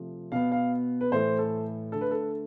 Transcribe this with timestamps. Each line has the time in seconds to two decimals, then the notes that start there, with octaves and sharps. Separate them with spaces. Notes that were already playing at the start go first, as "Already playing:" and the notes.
Already playing: C3 F3 A3
0.32 B2 B3 F5
0.52 F5
1.01 B4
1.12 A2 E3 A3 C5
1.39 A4
1.92 D3 A3 A4
2.01 B4
2.11 A4